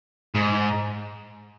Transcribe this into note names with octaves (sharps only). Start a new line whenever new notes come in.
G#2